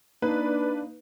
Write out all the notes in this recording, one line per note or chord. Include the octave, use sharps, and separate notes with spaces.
A#3 D4 D#4 B4